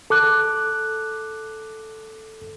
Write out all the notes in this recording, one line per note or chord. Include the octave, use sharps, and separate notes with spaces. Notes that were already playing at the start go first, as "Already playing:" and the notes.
A4 D6 F#6